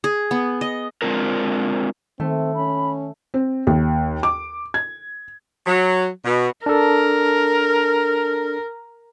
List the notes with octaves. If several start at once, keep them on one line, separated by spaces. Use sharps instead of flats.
G#4
B3
D#5
G#3 C4 D4 F4 A#4
D#3 A3 C4
C#4 B5
C4
D#2
D6
G#6
F#3
B2
D4 A4 A#4